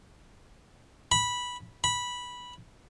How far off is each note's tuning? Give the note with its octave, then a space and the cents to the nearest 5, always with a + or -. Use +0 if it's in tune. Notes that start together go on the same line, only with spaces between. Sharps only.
B5 -10
B5 -10